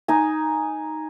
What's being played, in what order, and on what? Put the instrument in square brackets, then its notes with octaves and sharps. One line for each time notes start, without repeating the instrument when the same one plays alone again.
[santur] D#4 G#5